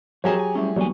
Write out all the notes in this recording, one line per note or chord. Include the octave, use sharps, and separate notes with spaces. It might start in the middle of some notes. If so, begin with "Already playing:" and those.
F3 F#3 G4 G#4 A#4 C#5 E5 A#5
G#5
G3 A3 C#4 E4
D2 E3 F#3 G3 A#3 B3 G#5 C#6